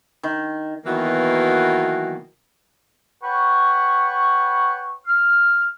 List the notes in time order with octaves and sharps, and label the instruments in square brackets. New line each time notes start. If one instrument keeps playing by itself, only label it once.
[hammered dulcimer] D#3
[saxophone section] B2 D#3 E3 F#3 A#3 B3
[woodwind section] B4 C#5 F#5 G5 B5 C#6
F6